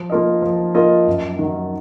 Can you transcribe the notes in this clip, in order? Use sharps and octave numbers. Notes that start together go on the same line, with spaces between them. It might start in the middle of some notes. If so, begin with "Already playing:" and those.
Already playing: F3
A#3 F4 A#4 D#5
F3
A#3 F4 A#4 D#5
F#2
D#3 F#3